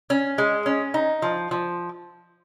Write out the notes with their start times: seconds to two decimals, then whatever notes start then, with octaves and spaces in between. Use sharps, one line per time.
0.10 C#4
0.38 G#3
0.66 C#4
0.94 D#4
1.22 F3
1.51 F3